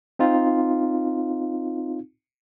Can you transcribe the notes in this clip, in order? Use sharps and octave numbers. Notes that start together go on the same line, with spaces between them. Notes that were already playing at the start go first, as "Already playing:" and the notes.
C4 D#4 F4